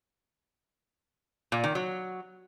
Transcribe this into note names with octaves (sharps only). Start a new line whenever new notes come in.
A#2
D#3
F#3